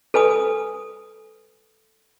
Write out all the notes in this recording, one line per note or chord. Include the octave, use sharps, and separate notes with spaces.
A4 B4 G#5 D#6